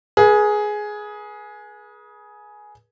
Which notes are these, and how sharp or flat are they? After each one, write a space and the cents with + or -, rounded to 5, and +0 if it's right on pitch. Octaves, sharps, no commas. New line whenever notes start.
G#4 +10 B4 -40